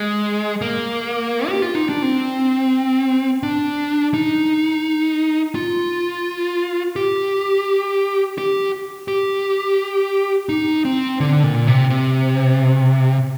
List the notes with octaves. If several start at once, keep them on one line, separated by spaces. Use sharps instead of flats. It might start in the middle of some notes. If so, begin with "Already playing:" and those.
Already playing: G#3
A#3
G4
F4
D#4
D4
C4
D4
D#4
F4
G4
G4
G4
D#4
C4
D3
A#2
C3
C3